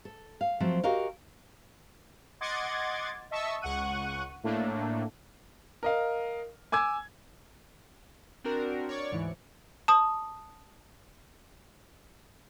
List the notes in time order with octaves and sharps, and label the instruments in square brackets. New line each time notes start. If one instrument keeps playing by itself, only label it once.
[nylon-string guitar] A4
F5
F3 F#3 A3 C4
F#4 G4 A#4 D#5 F5
[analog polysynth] D#5 F#5 C6 D6 G#6 A6
D#5 E5 A5 C#6 E6
C#2 F#5 C#6 F#6 D#7
A2 A3 A#3 D4
[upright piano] A#4 D#5 F5
G#5 D6 E6 G#6
[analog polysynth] C4 D4 F#4 A#4
C#5 D5 C#6
D2 G#2 E3
[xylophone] A5 D#6